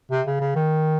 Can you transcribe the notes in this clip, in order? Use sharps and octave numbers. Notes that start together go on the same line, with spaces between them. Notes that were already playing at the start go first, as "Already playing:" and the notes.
C3
C#3
C#3
D#3